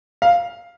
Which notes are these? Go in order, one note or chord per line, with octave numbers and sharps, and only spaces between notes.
F5